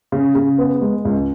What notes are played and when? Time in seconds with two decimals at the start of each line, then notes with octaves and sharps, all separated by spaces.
0.12 C#3
0.35 C#3
0.58 B3
0.81 G#3
1.05 C#2